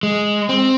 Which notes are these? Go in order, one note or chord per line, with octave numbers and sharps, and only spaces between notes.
G#3
C4